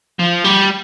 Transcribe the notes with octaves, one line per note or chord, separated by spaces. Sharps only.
F3
G3